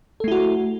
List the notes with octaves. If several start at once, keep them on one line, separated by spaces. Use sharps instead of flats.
A3 E4 F#4 A4